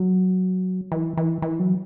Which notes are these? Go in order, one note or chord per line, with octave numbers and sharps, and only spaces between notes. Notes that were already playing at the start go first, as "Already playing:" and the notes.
Already playing: F#3
E3
E3
E3
F#3